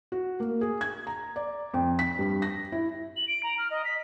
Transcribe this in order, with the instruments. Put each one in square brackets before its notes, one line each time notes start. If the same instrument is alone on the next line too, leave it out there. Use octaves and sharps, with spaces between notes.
[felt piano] F#4
A#3
G#4
G#6
A#5
D5
F2
B6
G2
A#6
E4
[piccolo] F#7
D7
A#5
F6
D#5
B6